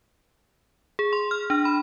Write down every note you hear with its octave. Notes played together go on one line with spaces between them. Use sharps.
G#4
C6
F6
D4
B5